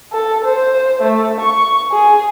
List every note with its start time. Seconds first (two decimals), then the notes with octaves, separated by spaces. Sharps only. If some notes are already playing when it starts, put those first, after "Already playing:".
0.12 A4
0.44 C5
1.02 A3
1.41 C#6
1.92 G#4